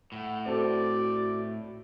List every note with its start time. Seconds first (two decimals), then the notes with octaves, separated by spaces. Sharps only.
0.12 A2 F#5
0.46 C4 F#4 A4 D5